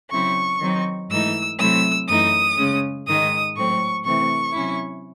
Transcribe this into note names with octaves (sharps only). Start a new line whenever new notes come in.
C#3 F#3 C4 E4 C#6
D#3 F#3 C4 D#4
G#2 E3 A3 D#4 E6
C3 F#3 A3 C4 E4 E6
F#2 E3 A3 D#4 D#6
C#3 G#3 C#4
G#2 D#3 G#3 D#4 D#6
A2 F#3 A3 C4 C#6
C3 E3 A3 C4 C#6
C3 F#3 C#4 E4